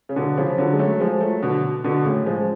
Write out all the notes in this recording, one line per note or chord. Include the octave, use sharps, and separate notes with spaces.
C#3
B2 D3
C#3 F3
D3 F#3
G#3
F#3 A3
F3 G#3
F#3 A3
B2 D3
B2
B2 D3
A2 C#3
F3 G#3